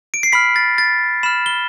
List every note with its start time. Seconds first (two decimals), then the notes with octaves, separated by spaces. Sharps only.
0.14 D7
0.23 C7
0.32 B5 F6 B6
0.56 A6
0.78 A6
1.23 B5 F6 E7
1.46 G7